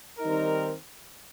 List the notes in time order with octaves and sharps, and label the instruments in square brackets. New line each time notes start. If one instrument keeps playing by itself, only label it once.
[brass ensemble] D#3 G3 C4 D#4 A#4